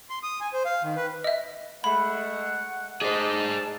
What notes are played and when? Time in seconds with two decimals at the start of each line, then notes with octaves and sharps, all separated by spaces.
0.10 C6
0.23 D#6
0.41 G#5
0.53 C5
0.65 F5
0.83 D#3
0.97 B4
1.24 D#5 E5
1.84 G#3 A3 F#5 B5
3.02 G#4 C5 D5 D#5 A5